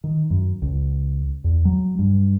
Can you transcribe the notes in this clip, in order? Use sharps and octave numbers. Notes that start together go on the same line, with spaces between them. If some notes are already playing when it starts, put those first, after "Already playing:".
D#3
F#2
C#2
E2
F#3
G2